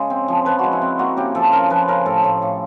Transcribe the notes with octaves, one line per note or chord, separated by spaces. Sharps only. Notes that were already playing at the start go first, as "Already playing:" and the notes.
Already playing: C#3 G#3
C4
F3
F3 B4
G#3 F#4
E4
C4
A#3 F#4
C#3 G4
F3 A4
C#3 A#4
F3 B4
C#3 A#4
A2 A4
A2
A2